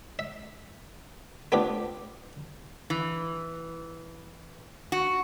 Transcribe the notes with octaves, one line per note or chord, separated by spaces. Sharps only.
E5
A3 B3 C4 D4 F4 G4
E3
F#4